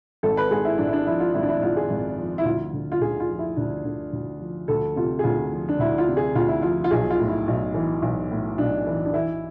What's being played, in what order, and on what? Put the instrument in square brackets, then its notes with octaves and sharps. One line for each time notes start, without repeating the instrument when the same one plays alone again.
[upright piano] G#1 A4
B4
G#2 G#4
E4
G#1 D4
E4
D4
F3 E4
F4
G#1 E4
D4
E4
G#2 F4
G#4
G#1
F3
E4
D2 F4
D3
F4
D2 G#4
F4
F3
E4
D2 D4
D3
D2
F3
D2 A4
C3 F4
G#4
D2 F4
F3
D4
D2 E4
F4
C3
G#4
D2 F4
E4
F3 F4
F4
B1 G#4
F4
A2
E4
B1
E3
B1
A2
B1 D4
E3
D4
E3 E4